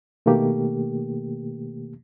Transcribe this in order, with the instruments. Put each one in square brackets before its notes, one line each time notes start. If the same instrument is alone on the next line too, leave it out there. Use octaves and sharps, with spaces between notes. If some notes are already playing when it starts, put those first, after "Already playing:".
[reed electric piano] B2 D#3 A3 A#3 G4